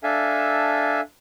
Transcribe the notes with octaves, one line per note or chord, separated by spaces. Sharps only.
D4 A4 E5 F5 G#5